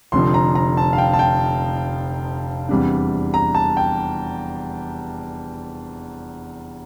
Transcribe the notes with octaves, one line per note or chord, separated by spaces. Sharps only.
F1 F2 D3 F3 C6
A#5
A#5
A5
F5
G5
A5
G5
E2 C3 G3 D4
A#5
A5
G5